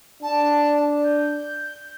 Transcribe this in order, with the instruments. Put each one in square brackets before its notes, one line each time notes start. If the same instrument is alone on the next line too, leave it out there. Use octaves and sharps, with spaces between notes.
[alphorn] D4 [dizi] A5
[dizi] G6